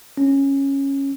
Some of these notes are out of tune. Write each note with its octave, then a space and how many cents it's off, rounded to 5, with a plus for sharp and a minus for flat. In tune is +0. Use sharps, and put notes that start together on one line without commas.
C#4 -10